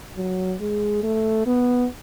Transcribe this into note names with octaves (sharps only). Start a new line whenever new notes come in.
F#3
G#3
A3
B3